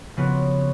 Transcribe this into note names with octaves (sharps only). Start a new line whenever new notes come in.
C#3 F3 B3 F#4